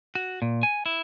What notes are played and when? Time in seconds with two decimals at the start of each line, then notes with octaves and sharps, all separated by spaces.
0.15 F#4
0.42 A#2
0.63 G#5
0.86 E4